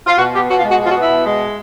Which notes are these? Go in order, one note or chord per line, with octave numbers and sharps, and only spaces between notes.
F4
B2 F#4
B3 G4
B2 F#4
F4
G#3
F#4
B2
F4
F#4
B3
E4
B2
G#3